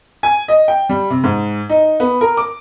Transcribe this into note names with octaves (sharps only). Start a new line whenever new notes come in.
G#5
D#5
G5
G3
C3
G#2
D#4
B3
A#4
D6